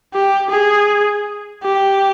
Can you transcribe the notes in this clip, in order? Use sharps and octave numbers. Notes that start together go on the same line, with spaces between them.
G4
G#4
G4